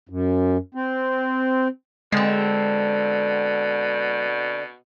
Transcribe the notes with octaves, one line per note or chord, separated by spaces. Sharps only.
F#2
C4
B2 D3 G#3 C4